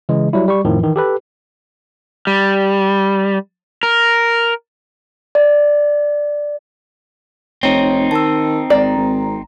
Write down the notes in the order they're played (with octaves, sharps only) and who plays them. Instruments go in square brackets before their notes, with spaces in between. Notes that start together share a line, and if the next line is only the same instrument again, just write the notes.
[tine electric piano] C#3 E3 G#3
F#3 G3 E4
G3 C#6
F2 A2 D#3 F3
D#3 E3
G4 A4 B4
[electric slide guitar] G3
A#4
[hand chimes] D5
[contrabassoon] F1 [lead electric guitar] C4 D#4 [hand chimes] C#5
[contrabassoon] D#3 [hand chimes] A5 E6
[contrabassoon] G#1 [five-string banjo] D5 [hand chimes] A#5
[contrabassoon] G#1